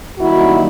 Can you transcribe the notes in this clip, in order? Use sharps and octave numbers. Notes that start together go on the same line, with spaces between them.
F#2 D#3 G3 A#3 D#4 E4 F#4